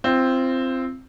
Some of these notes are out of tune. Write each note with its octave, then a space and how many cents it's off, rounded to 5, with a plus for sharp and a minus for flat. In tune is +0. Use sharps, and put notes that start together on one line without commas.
C4 +0 F4 -30